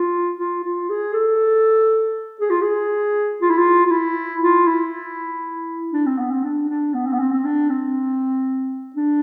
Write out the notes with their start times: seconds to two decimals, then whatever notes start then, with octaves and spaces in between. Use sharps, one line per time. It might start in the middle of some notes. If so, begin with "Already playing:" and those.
Already playing: F4
0.39 F4
0.64 F4
0.89 G#4
1.13 A4
2.40 G#4
2.50 F4
2.61 G#4
3.41 F4
3.50 E4
3.58 F4
3.86 F4
3.91 E4
4.42 F4
4.68 E4
5.93 D4
6.06 C4
6.18 B3
6.31 C4
6.44 D4
6.69 D4
6.94 B3
7.07 C4
7.13 B3
7.19 C4
7.33 C4
7.45 D4
7.70 C4
8.96 D4